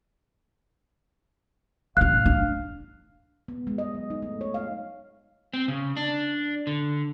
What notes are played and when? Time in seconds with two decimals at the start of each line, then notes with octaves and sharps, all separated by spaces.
1.97 A1 C#3 F5 F#6
2.26 D4
3.48 B3
3.67 G#3
3.78 D#5
3.94 F#3
4.10 D#4
4.22 A3
4.41 C#5
4.54 F5
5.54 C4
5.68 C#3
5.97 D4
6.67 D3